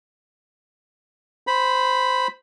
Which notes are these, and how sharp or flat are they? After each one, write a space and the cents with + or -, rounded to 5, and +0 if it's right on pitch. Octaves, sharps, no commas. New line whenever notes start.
C5 -10 B5 +0